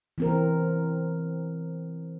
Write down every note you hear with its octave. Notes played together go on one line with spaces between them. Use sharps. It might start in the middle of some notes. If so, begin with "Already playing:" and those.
E3 C4 A#4